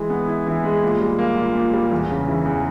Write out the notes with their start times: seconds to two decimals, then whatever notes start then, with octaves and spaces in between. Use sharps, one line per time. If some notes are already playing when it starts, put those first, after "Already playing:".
Already playing: E3 G#3
0.10 B3
0.28 E4
0.47 E3
0.64 G#3
0.83 A#2
1.00 G3
1.19 A#3
1.37 A#2
1.55 A#2
1.73 G3
1.91 E2
2.10 C#3
2.28 E3
2.45 E2